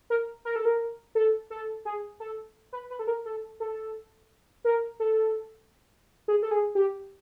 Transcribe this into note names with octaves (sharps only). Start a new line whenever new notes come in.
A#4
A#4
A4
A#4
A4
A4
G#4
A4
B4
B4
A4
A#4
A4
A4
A#4
A4
G#4
A4
G#4
G4